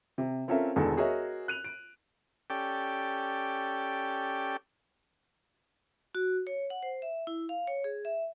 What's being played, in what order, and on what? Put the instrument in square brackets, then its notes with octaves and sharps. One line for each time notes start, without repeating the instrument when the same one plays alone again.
[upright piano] C3
C4 C#4 F4 A4 A#4 E5
E1 E2 D3 D#3 G#4 A4
F#4 G#4 A#4 C#5 D#5 E5
F#6 D#7 F7
D7
[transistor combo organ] C#4 G4 A4 D5 G5
[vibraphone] F#4
C#5
F#5
C5
E5
E4
F5
C#5
G#4
E5